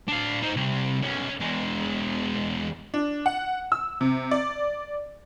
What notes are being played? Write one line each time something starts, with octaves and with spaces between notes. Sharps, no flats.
D4 F5
D#4 C5
C3 G3
B1 C#4
E2 G#3
D4
F#5
E6
C3
D5